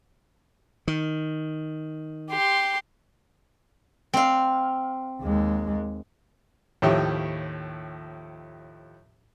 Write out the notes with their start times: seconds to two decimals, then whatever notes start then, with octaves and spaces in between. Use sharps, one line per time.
0.88 D#3
2.30 G4 C6
4.14 C4 F5
5.21 D#2 G#3
6.82 D#2 A2 F3 G4 C#5 E5